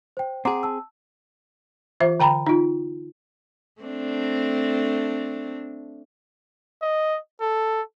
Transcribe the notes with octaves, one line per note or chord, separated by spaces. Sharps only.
C5 G5
C4 G#4 F#5 A#5 D6
A5 E6
E3 F4 C5 E5
D3 G5 A#5 B5
D#4 F4
A3 C4 D4
D#5
A4